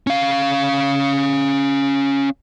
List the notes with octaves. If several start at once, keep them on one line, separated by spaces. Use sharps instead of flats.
C#4 F5